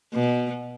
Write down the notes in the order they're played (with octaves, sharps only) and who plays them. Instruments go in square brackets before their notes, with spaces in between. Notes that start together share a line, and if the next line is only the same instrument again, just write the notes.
[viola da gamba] B2